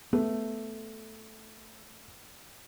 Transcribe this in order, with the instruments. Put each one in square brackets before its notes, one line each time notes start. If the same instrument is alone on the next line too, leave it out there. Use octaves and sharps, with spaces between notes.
[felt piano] A3 [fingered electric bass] B3